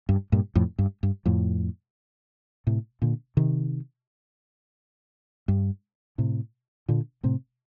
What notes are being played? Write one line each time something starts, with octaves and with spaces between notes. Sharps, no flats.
G2
G2 A#2
F2 A2
G2
G2
F2 A2
A2 C3
A#2 D3
C3 D#3
G2
A2 C3
A#2 D3
A2 C3